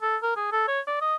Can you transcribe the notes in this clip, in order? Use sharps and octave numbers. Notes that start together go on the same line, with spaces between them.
A4
A#4
G#4
A4
C#5
D5
D#5